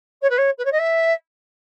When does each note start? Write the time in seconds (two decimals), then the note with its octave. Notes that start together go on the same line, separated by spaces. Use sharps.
0.22 C#5
0.30 B4
0.38 C#5
0.58 B4
0.65 C#5
0.72 D#5
0.79 E5